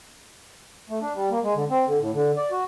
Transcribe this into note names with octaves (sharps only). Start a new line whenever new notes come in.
A3
D4
G3
A#3
G#3
D3
C4
D3
A2
D3
D5
F#4